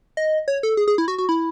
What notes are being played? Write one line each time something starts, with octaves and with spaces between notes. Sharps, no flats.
D#5
C#5
A4
G#4
G#4
E4
F#4
F#4
E4